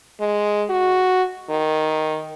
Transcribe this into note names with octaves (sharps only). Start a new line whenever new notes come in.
G#3
F#4
D#3